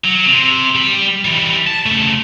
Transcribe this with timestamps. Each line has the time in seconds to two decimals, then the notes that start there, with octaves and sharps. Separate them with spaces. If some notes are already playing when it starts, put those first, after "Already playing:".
0.04 F#3
0.27 C3
0.75 G3 B5
1.25 E3 G3
1.67 A5
1.86 C#3 A3